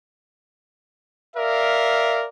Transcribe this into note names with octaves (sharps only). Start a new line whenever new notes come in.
A#4 D5 E5 F5